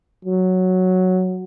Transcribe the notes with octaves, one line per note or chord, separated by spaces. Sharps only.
F#3